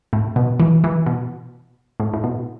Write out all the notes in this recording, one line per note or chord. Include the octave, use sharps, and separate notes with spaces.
A2
B2
E3
E3
B2
A2
A2
B2